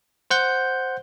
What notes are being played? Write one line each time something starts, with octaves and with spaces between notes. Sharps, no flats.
C5 F#5 G6